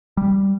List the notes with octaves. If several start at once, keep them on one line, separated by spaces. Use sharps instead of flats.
G3